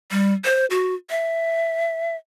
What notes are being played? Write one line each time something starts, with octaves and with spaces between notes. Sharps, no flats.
G3
C5
F#4
E5